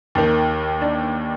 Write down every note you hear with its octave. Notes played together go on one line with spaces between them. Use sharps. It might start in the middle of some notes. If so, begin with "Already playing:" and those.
D#2 D#3
D4 D5